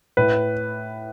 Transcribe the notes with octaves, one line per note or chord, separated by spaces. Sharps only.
A2 B4